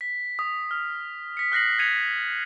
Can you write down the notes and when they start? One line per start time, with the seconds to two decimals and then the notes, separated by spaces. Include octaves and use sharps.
0.01 B6
0.39 D#6
0.71 F6
1.37 B6 C#7
1.52 F6 F#6 A#6 C7 F#7
1.79 G#6 B6 C#7 D#7 F7